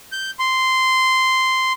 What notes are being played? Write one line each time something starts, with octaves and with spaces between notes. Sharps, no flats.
G6
C6